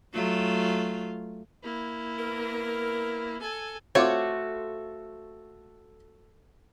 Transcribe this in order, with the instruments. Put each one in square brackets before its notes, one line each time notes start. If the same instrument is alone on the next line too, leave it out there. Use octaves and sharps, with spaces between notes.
[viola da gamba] F#3 A3 F4
[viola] A#3 E4
[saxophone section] B3 A#4
[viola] A4 G#5
[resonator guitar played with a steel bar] A3 [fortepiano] C4 F4 D6 [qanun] F#4 [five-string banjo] C#5